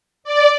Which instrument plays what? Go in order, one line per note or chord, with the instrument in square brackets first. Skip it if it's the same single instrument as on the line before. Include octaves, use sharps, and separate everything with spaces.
[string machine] D5